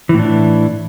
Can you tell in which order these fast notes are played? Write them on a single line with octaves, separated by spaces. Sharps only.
E3 A2 D4